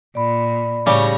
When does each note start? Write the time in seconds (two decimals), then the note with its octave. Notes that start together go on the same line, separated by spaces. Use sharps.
0.15 A#2 D5 B5
0.86 A2 C#3 G3 C#5 A#6